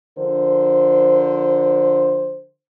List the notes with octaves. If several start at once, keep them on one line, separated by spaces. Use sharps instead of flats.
D3 F3 A#4 C5